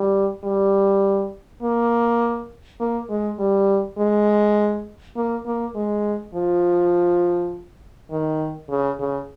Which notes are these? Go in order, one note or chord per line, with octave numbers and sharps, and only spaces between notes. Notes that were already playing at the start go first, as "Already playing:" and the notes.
Already playing: G3
G3
A#3
A#3
G#3
G3
G#3
A#3
A#3
G#3
F3
D#3
C#3
C#3